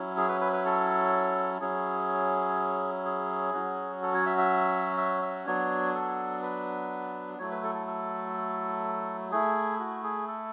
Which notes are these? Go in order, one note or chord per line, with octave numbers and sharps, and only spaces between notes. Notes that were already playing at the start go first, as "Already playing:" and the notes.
Already playing: F#3 C#4 E4
G#4
B4
B4
B4
A4
F#3 C#4 E4 G#4
G#4
F#3 C#4 F#4
A4
C#5
E5
E5
E5
E5
F#3 B3 D4 C#5
A4
B4
F#3 A3 E4 C#5
B4
A4
A4
A4
A3 E4 G#4
F#4
G#4
A4